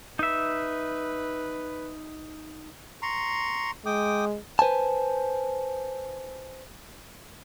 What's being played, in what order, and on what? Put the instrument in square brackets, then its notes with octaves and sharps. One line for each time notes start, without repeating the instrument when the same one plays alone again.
[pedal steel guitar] D#4 E5 [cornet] B4
[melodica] A#5 C6 C#6
[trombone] G#3 [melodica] G5 D6 D#6
[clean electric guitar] B4 C5 G#5 A5